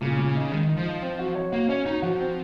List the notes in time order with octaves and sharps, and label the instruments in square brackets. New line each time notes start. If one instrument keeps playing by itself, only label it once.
[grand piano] A#2 [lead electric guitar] C#3
[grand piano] A#2
[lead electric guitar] C#3 [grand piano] D#4
[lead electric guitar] D#3 [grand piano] G#3
[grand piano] D#4
[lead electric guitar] F3
[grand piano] D#4
C4
F#4
C#5
[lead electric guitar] A#3 [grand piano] F#4
[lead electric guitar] C#4 [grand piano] C#5
[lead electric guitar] D#4 [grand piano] F#4
[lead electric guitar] F3 [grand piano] F#4
[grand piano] C4